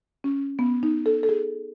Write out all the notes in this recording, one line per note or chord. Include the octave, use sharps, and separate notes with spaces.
C#4
B3
D#4
A4
A4
G#4